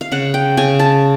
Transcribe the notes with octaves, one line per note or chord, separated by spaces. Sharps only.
F5
C#3 F#5
G5
C#3 G#5
A5